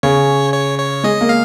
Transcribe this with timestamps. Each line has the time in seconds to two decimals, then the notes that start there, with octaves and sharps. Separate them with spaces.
0.03 C#3 C#5
0.53 C#5
0.78 C#5
1.04 G#3 D#5
1.21 A#3
1.29 F5